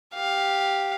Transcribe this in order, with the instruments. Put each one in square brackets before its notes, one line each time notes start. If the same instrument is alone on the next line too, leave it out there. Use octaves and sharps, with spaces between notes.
[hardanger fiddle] G4 F5